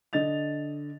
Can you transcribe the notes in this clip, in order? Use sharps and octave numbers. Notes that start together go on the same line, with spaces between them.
D3 D#5 A6 F7